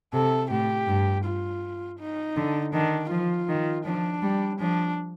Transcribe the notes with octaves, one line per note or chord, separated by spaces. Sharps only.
C3 A4
A2 G4
G2
F4
D#4
D3
D#3 D4
F3 F4
D#3
F3 D4
G3
F3 D4